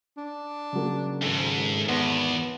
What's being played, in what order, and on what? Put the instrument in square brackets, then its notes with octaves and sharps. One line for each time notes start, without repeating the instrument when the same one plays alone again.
[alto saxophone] D4
[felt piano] C#3 F#3 A#3
[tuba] G#1 [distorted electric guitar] D2 G#2 [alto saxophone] A4
[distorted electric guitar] E2 [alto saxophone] B3 [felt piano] A5 C6